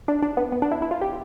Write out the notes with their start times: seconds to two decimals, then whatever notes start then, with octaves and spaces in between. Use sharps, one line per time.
0.08 D4
0.22 D4
0.37 B3
0.52 B3
0.62 D4
0.71 E4
0.82 E4
0.91 F4
1.01 G4